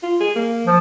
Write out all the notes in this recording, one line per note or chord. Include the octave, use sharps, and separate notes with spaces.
F4
G#4
A#3
F3